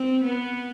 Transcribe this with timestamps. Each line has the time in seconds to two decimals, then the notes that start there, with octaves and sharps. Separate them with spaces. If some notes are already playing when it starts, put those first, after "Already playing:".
Already playing: C4
0.24 B3